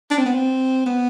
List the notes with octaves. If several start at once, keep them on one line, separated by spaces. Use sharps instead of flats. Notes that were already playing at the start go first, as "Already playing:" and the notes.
D4
C4
B3
C4
B3